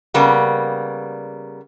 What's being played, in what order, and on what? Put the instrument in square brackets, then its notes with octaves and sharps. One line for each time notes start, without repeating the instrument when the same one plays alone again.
[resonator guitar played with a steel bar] C#3 G3 A#3 B3